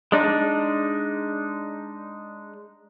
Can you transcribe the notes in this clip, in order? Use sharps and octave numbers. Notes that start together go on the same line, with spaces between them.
G#3 D4 D#4